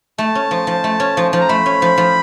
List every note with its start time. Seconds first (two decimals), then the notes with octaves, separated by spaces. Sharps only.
0.18 A3 A5
0.35 C#4
0.51 F3
0.67 F3
0.84 A3
1.00 C#4
1.17 F3
1.32 F3 A5
1.41 A#5
1.49 A3 B5
1.66 C#4
1.82 F3
1.98 F3